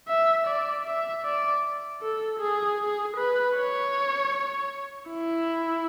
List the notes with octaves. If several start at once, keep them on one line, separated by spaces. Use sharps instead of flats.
E5
D5
E5
D5
A4
G#4
G#4
B4
C#5
E4